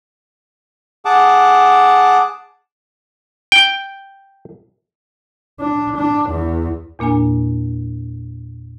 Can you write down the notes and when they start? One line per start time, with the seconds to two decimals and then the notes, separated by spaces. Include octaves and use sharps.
1.05 G#4 F#5 A5 D6
3.52 G5
5.60 D4
5.97 D4
6.30 E2
6.99 E2 A#2 A#3 D4 G#5